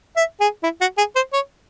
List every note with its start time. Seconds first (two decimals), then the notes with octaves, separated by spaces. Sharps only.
0.16 E5
0.40 G#4
0.63 E4
0.81 F#4
0.98 G#4
1.16 C5
1.33 C#5